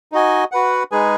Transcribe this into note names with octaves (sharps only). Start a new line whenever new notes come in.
D#4 F#4 D#5 G#5
F#4 B4 F#5
G#3 D#4 G#4 B4 G#5